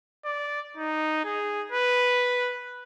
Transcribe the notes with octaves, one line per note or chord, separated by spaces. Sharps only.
D5
D#4
G#4
B4